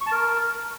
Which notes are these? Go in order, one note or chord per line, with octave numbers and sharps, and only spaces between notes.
C#6
A5
A#4